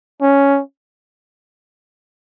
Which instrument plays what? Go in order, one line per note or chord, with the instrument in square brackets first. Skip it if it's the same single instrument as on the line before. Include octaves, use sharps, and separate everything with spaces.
[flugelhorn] C#4